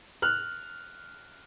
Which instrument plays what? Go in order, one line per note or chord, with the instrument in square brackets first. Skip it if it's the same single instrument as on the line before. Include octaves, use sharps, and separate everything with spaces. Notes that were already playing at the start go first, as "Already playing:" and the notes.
[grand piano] F6 F#6